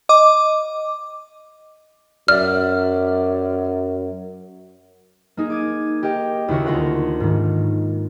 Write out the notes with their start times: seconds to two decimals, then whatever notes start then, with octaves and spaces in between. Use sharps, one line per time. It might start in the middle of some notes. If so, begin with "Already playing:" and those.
0.09 D#5 D6
2.28 F#2 D5 E5 F6
5.37 A#3 D#4 G#4
5.50 D6 G#6 D#7
6.03 G4 A#4 D#5 G5
6.48 D#2 C#3 E4 F#4 A#4 C#6
6.66 D2 F4 A#4 F#5
7.20 G#2 D#3